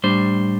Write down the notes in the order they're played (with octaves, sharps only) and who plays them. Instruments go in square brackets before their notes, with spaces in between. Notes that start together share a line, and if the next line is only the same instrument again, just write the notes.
[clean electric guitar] A2 G3 D4 C5